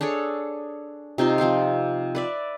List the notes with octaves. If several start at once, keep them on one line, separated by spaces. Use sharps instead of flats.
D4 G#4 A4 C#5
C3 D#4 F4 C6
F3 C4 C5 F5
B4 D5 E5